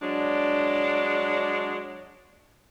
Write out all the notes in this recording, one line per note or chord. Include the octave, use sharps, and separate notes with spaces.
F#3 G#3 D4